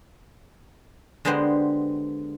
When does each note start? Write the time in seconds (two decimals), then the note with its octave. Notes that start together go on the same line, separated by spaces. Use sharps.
1.25 D3 G#3 B3 G4 C5